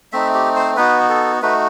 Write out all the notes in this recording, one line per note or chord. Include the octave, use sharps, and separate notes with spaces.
A3 C4 D#4 E5
G4
C5
B3 D#4 F#4 B4
A4
A3 D#4 F#4 B4